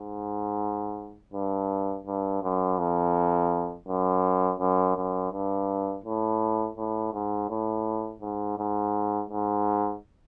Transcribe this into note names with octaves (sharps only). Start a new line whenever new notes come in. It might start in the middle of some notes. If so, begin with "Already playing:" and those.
Already playing: G#2
G2
G2
F#2
F2
F#2
F#2
F#2
G2
A2
A2
G#2
A2
G#2
G#2
G#2